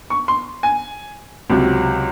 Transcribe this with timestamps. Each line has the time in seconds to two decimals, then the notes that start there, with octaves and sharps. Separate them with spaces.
0.10 C#6
0.28 C6
0.63 G#5
1.50 C#2 C3 F#3